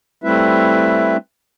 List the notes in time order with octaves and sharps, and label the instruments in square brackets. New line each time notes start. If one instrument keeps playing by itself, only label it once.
[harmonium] G3 A3 C4 E4 B4 E5